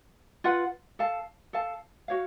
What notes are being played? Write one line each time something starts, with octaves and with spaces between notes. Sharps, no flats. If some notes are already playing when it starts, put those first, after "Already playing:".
F4 B4 F#5
A4 F5 A5
A4 F5 A5
F#4 C#5 F5